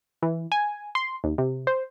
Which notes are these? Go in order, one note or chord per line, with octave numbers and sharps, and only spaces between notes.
E3
G#5
C6
D#2
C3
C5